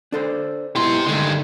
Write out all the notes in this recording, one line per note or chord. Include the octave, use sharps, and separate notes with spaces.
D4 A4 C5
G#2 B2 E4 G4 C6
G2 D3 D#3 G#3 A3